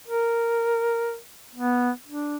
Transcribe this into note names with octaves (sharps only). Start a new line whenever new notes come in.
A#4
B3
D4